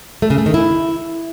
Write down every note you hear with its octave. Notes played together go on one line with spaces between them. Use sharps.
A3
C#3
A3
D#3
E4